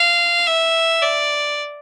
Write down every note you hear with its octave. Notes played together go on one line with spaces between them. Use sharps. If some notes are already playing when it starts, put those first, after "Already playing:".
Already playing: F5
E5
D5